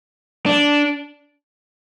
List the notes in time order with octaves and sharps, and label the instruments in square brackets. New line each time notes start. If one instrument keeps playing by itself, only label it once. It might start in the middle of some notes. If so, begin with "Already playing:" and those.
[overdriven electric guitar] D4